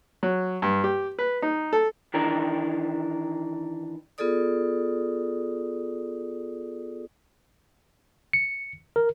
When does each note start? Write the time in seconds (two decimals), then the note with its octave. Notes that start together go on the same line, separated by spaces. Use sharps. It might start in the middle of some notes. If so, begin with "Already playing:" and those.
0.23 F#3
0.62 G2
0.84 G4
1.19 B4
1.42 D#4
1.73 A4
2.14 D#3 E3 D4 A#4
4.18 B3 F4 G#4 A4 D5 D#6
8.33 C#7
8.96 A#4